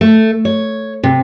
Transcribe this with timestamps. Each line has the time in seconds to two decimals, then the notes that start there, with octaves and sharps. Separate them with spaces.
0.01 A3
0.45 C#5
1.03 C3